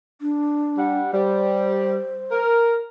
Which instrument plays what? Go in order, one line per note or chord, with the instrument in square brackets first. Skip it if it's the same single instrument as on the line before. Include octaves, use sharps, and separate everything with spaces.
[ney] D4
[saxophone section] G3 F#5
[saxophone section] G3 [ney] C5
[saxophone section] A#4